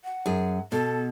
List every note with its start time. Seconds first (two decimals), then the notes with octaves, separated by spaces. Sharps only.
0.04 F#5
0.26 F#2 G#4
0.72 B2 A4